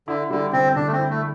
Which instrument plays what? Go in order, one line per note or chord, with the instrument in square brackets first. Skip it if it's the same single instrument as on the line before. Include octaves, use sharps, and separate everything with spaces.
[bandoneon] D3 [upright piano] E4
[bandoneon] D3 [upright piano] G3
[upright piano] D3 [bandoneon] C4
[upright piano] D3 [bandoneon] D4
[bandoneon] A3
C4
[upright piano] E4
[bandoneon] A3